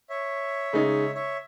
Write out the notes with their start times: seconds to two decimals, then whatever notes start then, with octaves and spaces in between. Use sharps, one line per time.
0.10 C#5 E5
0.73 C#3 G#3 D#4
1.15 C#5 E5